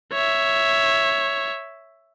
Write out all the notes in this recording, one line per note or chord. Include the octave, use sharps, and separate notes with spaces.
C#5 E5